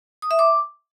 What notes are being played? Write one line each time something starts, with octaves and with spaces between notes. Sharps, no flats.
D#6
E5
D6